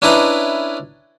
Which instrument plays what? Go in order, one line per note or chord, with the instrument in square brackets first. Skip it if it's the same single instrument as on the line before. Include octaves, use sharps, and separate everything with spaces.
[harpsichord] C#4 D4 E4 B4 D#5 A#5